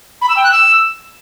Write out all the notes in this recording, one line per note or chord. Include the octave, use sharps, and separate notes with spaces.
B5
E6
G5
F#6
E6